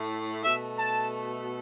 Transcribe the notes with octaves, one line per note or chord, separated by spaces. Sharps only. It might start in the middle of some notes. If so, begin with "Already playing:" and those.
Already playing: A2 A3
B2 A3 E5
A5